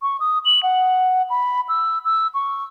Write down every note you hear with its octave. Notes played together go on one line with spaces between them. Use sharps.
C#6
D#6
F#7
F#5
B5
E6
E6
C#6